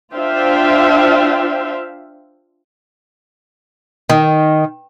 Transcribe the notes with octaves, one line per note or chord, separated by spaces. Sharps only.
D4 F4 C5 E5 F5 G5
D#3